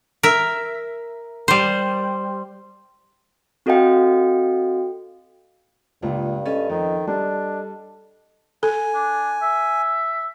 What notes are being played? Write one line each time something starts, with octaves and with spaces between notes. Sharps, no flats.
A#4 E5
G3 C5
C4 F#4 A4 D#5 F5 G5
C#2 G2 A#2
C#4 A4 D#5
F2 D#3
G3 D4
A4 G#5
D4
E5